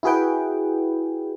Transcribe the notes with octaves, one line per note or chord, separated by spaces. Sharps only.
E4 F#4 G#4 B4 G5